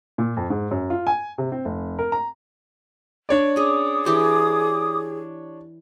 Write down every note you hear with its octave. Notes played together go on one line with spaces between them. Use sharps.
A#2
F2
G#2
F#2
F4
G#5
C3
C4
F1
A#4
A#5
D4 C#5 D5
C#4 G#4 D6 D#6
E3 G4 G#4 C6